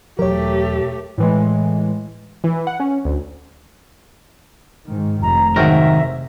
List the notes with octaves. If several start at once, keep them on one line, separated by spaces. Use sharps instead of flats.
E1 F#3 A3 G4 A#4 C#5
A2 E3 G#3
E3
F#5
C#4
D2
G#2 D#3
F1 A#5
G#2 C3 D#3 F#3 A#4 E5 G5